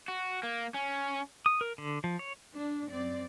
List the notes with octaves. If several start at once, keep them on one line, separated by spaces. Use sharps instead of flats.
F#4
A#3
C#4
D#6
A#4
D3
F3
C#5
D4
F#2 C4 D5